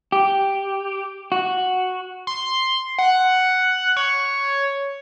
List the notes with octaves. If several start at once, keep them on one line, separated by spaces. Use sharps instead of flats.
G4
F#4
C6
F#5
C#5